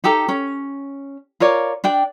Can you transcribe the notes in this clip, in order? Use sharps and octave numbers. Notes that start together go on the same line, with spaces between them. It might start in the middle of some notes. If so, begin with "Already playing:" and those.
D#4 G4 A4 A#5
C#4
F4 A#4 C#5 D5
D4 D5 G5